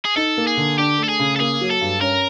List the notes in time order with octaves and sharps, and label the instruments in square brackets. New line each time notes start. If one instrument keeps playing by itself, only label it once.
[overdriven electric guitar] G#4
[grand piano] D#4 [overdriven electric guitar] A4
[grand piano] A#3
[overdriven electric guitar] G#4
[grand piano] D3
[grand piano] D4 [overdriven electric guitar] G4
[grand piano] A3
[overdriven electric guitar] A4
G#4
[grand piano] C#3
[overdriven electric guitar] A4
[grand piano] A#3 [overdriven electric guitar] G#4
[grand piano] F#3
[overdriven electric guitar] A4
[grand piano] G2
[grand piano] C#4 [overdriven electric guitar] A#4